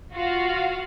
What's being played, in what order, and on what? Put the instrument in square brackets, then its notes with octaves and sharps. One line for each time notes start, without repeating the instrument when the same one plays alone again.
[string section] F4 F#4 F5